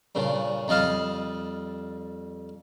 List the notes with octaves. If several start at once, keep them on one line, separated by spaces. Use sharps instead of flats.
G2 A#2 C#3
F2 G3 D#5 F5 A5